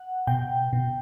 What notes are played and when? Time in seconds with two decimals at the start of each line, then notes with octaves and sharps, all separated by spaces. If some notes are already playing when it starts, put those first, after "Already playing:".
Already playing: F#5
0.27 B2 G5
0.73 B2